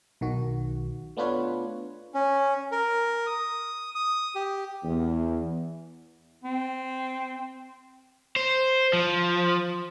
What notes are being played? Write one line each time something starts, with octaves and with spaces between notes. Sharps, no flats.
B1 D#3 F#4
A3 B3 D4 F4 B4 C#5
C#4
A#4
D#6
D#6
G4
E2
C4
C5
F3